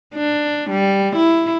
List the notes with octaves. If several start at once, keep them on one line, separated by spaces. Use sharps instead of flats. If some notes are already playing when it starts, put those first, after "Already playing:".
D4
G3
E4